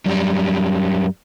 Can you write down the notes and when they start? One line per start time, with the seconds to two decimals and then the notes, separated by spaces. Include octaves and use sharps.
0.06 F#2 G3